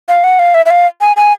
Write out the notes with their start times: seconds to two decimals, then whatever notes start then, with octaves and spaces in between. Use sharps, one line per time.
0.09 F5
0.24 F#5
0.39 F5
0.54 E5
0.66 E5
0.70 F5
1.01 G#5
1.17 G#5